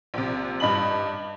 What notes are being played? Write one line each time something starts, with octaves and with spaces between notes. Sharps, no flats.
A#1 C3
G2 D#5 B5 F#7